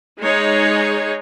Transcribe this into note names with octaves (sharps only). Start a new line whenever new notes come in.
G#3 D#4 G#4 C#5